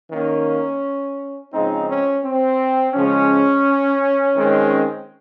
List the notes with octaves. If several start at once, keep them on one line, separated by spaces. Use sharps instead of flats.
D#3 A#3 C#4
C#3 F3 G#3 C4 D#4
C#4
C4
C#3 F3 G#3 C#4
D#3 G#3 C4